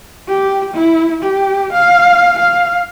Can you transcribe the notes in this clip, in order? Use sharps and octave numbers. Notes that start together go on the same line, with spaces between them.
G4
E4
G4
F5
F5